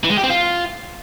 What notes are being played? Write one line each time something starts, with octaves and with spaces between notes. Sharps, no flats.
E3
G#3
G4
C4
F4